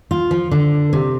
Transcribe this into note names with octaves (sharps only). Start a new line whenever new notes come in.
F4
F3
D3
C3